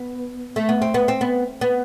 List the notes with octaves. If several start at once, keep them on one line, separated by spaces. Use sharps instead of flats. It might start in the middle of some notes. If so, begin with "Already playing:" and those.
Already playing: B3
A3
B3
C4
B3
C4
B3
B3